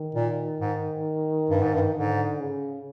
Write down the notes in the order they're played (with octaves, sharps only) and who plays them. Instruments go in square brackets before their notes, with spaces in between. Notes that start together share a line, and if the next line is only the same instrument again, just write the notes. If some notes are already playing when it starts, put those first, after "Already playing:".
Already playing: [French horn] D#3
[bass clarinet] A#2
G#2
G2
G#2
G2
[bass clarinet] G#2 [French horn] D3
[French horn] C#3